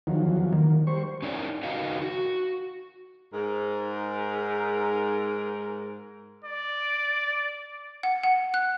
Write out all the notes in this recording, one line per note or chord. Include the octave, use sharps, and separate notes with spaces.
E2 D#3 F3 F#3
D#3 A#3
G3 C5 C#6
C#4 D#4 E4 A#4 D5
D#4 F#4 A#4 B4 D#5 F5
F#4
G#2 A#4
D5
F#5
F#5
F#6